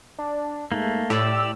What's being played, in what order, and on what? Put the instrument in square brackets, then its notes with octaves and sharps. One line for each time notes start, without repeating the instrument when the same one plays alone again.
[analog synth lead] D4
[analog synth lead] G#2 [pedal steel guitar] A3 A#3
[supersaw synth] A2 [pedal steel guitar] G4 D5 [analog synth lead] E6